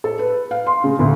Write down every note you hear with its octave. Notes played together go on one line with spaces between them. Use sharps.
A4
B4
F5
C6
C#3
D2